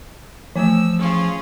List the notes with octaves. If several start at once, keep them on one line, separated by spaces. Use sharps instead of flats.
E3 F3 A3 E6
C#4 F4 G#4